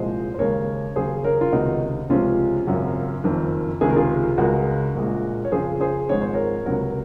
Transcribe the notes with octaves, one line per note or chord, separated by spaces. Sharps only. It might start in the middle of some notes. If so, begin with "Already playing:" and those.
Already playing: C2 A#2 F3 G#3 C5 D#5
C5
D#2 C#3 G#3 A#4 C#5
D#2 C#3 F#3 G#4 C5
A#4 C#5
F4
C#2 C3 D#3 D#4 F#4
C#2 C3 F3 G#3 C#4 F4
G#1 F#2 C#3 F#3
F#1 F2 D#3
C#2 C3 D#3 G#4
A#4
F4 G#4
C#2 C#3 G#3 F#4 A#4
A#1 A#2 G#3
C#5
F2 C#3 F3 G#4 C5
G#4 C5
G#1 G#2 F3 G#3 C#5
C5
A#4 C#5
C#2 C3 F#3 F#4 A#4